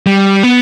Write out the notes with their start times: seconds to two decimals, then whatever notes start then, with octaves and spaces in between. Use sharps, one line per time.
0.07 G3
0.43 B3